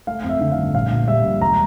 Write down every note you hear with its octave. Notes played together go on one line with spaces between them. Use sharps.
A3 F5
F2
E5
D3
F5
G1
A#1 F5
A#2
G3 E5
A#1
E1 A#5